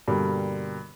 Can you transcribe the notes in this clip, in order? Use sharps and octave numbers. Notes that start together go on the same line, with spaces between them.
G2 B2 D3 G3 A#3